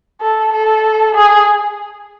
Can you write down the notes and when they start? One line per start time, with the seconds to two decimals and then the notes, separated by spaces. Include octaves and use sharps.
0.22 A4
0.53 A4
1.15 G#4